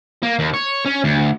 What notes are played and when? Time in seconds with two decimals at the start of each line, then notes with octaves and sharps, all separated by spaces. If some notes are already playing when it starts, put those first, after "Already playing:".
0.23 A#3
0.39 D#2
0.54 C#5
0.86 C#4
1.04 D2